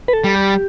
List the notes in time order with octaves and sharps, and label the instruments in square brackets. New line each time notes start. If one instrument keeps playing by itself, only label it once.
[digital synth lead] B4
A4
[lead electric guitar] G3
[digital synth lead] G4